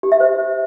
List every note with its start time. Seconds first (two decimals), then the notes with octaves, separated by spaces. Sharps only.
0.03 G4
0.12 E5
0.20 C5